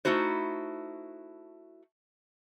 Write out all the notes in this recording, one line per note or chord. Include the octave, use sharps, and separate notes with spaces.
A3 D#4 E4 F#4 C5